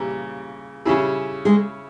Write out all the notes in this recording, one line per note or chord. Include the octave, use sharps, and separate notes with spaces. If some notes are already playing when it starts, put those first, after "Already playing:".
Already playing: C#3 E3 G3 A#3
C#3 G3 C#4 E4 G#4
G#3 G#4